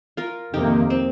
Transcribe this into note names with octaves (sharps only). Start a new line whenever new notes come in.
F4 A#4
F2 C3 D#3 A#3 D#4 G4
C4